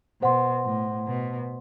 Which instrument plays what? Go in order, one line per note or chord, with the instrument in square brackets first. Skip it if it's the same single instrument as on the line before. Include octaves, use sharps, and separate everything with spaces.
[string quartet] B2 [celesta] C5 F#5 C6
[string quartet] A2
B2